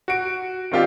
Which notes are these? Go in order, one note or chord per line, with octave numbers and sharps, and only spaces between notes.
F#4 D7
D#3 C4 F4 G4 D5